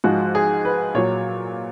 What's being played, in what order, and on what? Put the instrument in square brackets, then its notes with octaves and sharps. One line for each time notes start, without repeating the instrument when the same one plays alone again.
[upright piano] G#2 F3 G#3 F#4
G#4
B4
A#2 F#3 C#5